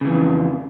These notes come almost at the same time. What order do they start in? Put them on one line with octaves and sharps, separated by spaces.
C#3 E3 F2